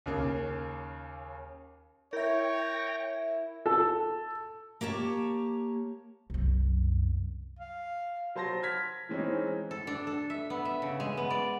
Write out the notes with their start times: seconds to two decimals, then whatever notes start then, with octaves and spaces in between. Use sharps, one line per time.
0.06 D#2 C#3 A#3
2.13 E4 A#4 C#5 E5 G5 A#6
3.66 A4
4.81 A#3 G4 C#5 A5
6.30 C2 F#2
7.59 F5
8.35 F#3 C5 A5 C6 A#6
8.63 F6 G#6 B6
9.09 E3 G#3 C4 C#4 D#4
9.71 A4
9.87 D4
10.07 A4
10.30 E5
10.50 B3
10.65 E5
10.82 C#3
11.00 G#3
11.17 B3
11.30 D5